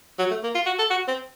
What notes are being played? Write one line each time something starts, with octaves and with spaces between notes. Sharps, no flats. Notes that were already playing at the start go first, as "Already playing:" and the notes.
F#3
A3
A#3
F4
F#4
A4
F#4
C4